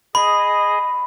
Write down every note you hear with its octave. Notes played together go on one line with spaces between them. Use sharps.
G#4 D#5 B5